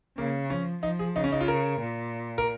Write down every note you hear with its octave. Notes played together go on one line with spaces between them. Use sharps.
C#3 A#3
F3 C#4
F3 D#4
G#4
C#3 D#4
C#4
D#4
F4
A#4
A#2
A#4